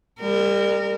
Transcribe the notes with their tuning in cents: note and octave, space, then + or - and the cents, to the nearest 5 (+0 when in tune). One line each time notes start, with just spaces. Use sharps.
G3 +30 A#4 -25